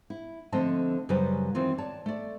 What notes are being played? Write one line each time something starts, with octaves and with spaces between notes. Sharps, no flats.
E4
D3 F3 A3 C4 D#5 A5
F#2 C#3 F#3 G3 B4 C5
D#3 E3 C4 F4
C#5 D5 A5
A3 D5